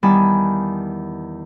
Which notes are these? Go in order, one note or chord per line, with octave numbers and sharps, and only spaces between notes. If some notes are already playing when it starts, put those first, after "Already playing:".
E2 D#3 G3 G#5 A5 B5